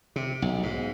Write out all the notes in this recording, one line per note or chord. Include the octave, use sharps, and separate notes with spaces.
C3
B1
G#2